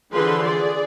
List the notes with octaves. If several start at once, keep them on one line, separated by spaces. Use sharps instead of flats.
D3 E3 F3 G#4 B4 C6
G#4 D5